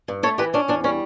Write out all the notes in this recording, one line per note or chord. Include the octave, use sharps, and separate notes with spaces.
G2
A3 A4 C#5
E3 G4 B4
C#4 D4
E2 D4
G3 C#4